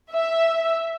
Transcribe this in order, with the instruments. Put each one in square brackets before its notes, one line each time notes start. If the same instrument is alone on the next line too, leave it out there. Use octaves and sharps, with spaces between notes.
[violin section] E5